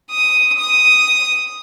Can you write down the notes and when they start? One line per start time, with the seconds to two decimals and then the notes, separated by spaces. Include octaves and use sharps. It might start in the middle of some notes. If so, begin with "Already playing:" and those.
0.10 D#6
0.58 D#6